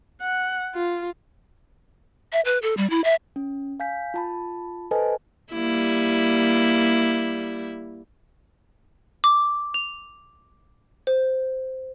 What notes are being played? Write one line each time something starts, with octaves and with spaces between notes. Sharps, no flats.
F#5
F4
E5
B4
A4
G3
E4
E5
C#4
F5 G#5 G6 B6
F4 A5 B5
A4 B4 C5 D#5 G#5 A5
G3 A#3 E4
D6
F7
C5